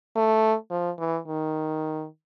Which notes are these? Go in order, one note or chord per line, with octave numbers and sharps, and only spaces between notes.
A3
F3
E3
D#3